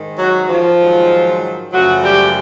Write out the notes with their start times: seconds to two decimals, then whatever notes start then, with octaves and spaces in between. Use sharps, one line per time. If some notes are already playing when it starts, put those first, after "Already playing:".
Already playing: G#2 D#3
0.18 F#3 F#4
0.49 F3 F4
0.81 G#2 D#3 F#3
1.73 F#2 C#3 F3 F#3 A3 F#4
2.03 G3 G4